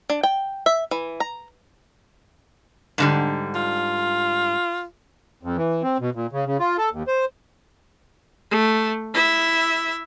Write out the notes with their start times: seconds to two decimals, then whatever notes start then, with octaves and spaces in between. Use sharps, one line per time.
0.10 D4
0.23 G5
0.66 E5
0.91 E3
1.20 A#5
2.98 G#2 D3 G3
3.55 F4
5.43 F2
5.57 E3
5.83 C4
6.00 B2
6.15 A#2
6.33 C#3
6.46 C#3
6.59 F4
6.78 A4
6.92 D#2
7.08 C5
8.51 A3
9.14 E4 E5